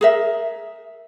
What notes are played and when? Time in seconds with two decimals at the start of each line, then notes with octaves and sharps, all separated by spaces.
0.01 G#4 A#4 E5